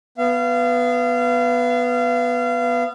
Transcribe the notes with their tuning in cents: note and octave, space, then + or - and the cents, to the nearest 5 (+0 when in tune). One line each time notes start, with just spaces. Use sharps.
B3 +5 F5 -30